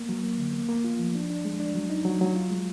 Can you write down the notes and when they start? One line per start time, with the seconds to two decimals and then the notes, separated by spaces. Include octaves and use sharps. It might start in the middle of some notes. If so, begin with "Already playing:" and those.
Already playing: A#3
0.09 F#3
0.24 A#3
0.38 D3
0.53 A#3
0.69 A#3
0.84 F4
0.99 F3
1.15 D4
1.30 D4
1.45 G#3
1.60 D4
1.75 F#3
1.90 D#4
2.05 F#3
2.21 F#3
2.36 F4
2.51 G#3